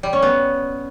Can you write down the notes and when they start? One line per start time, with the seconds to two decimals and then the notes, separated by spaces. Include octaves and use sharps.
0.03 G3
0.13 C#4
0.22 B3